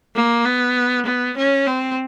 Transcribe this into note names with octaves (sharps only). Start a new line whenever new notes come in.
A#3
B3
B3
C#4
C4